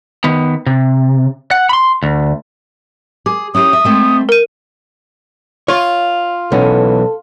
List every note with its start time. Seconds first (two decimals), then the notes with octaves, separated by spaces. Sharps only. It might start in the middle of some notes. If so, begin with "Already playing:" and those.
0.24 D#3 B3
0.66 C3
1.51 F#5
1.69 B5 C6
2.03 D2
3.26 G#4 D6
3.55 C#4 E4 G4 D#6
3.73 E5
3.84 G#3 A3 C4
4.29 A#4 D#7
5.68 F4 C#5
6.52 B1 E3 B3 C#4 A4